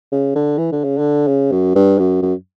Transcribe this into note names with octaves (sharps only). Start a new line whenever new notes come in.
C#3
D3
E3
D3
C#3
D3
C#3
F#2
G2
F#2
F#2